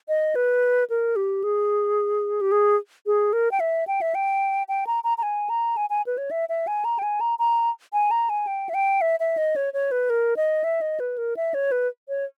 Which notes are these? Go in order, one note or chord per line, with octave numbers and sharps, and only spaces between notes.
D#5
B4
A#4
G4
G#4
G4
G#4
G#4
A#4
G5
E5
G5
E5
G5
G5
A#5
A#5
A#5
G#5
A#5
G#5
G#5
B4
C#5
E5
E5
G#5
A#5
G5
G#5
A#5
A#5
G#5
A#5
G#5
G5
E5
G5
E5
E5
D#5
C#5
C#5
B4
A#4
D#5
E5
D#5
B4
A#4
E5
C#5
B4
C#5